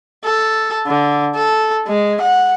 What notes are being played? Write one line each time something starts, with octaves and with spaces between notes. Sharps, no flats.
A4
D3
A4
G#3
F#5